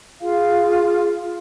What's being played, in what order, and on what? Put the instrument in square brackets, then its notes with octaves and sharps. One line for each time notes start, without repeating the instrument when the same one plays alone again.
[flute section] F4 G#4 F5